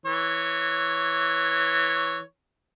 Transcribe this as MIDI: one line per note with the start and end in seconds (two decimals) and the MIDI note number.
0.06 2.20 52
0.06 2.20 73